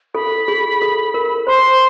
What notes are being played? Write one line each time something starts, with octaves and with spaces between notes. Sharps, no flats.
A4 B5
G#4
A4
A#4
C5 C6